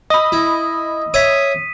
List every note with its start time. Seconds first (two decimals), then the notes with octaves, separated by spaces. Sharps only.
0.10 D#5 B5 D#6 E6
0.32 E4
1.14 C#5 E5 D#6 B6 D#7